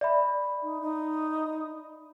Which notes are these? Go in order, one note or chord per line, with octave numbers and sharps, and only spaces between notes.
D5 E5 B5
D#4
D#4